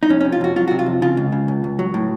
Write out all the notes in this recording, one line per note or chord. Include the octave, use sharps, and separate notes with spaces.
D#4
F2 C#4
C3 C#4
F4
F2 F#4
F#3 F4
C3 F#4
F4
F2
C#3 F4
C#2
C#3
C#2
C#2
F#3
A2